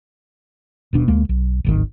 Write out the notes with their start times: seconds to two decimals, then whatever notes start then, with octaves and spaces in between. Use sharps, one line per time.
0.93 D#1 B2 D4
1.08 D2 G#3 A#3
1.29 B1
1.64 D1 G#1 D#3